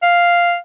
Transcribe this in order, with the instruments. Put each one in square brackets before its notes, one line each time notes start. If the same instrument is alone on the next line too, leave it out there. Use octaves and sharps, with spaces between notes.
[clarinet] F5